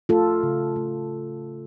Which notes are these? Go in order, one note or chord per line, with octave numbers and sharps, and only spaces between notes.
A3 F4 A4
C#3
A3